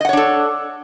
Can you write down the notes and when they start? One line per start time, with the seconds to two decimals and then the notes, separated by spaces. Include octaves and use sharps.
0.01 D#5
0.05 F#5
0.09 C#5
0.13 D4
0.17 A4